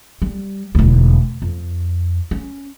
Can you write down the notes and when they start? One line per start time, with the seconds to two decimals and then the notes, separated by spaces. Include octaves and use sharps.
0.22 G3
0.75 E1 D2
1.42 F2
2.31 C#4